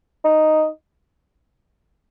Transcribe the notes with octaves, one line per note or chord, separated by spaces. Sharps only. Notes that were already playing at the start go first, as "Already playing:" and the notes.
D#4